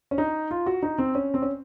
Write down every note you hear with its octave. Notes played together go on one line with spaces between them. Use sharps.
C#4
D#4
F4
F#4
D#4
C4
C#4
C4
C#4